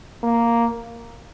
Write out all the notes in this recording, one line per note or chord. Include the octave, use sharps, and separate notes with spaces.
A#3